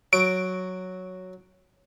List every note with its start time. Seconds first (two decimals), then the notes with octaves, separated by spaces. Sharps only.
0.13 F#3 D7